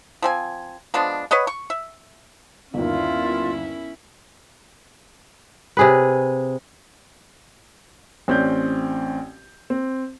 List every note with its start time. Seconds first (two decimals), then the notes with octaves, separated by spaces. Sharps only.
0.22 F3 C4 G#5
0.94 F3 G#3 B3 D4
1.31 B4 C#5 D#5 F#5
1.47 C#6
1.70 E5
2.74 G1 D#2 C#4 E4 F4
5.77 C3 G#4 B4
8.28 A1 C4 C#4 D5 G6
9.70 C4